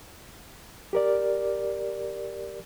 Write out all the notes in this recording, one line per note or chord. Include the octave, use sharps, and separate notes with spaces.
G4 A#4 D5